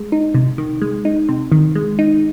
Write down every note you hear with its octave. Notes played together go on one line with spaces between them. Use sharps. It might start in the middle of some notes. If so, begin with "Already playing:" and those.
Already playing: G#3
D#4
C3
D#3
G#3
D#4
C3
D#3
G#3
D#4